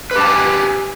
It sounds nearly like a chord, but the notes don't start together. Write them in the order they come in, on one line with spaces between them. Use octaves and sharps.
B4 G4 A5 G#5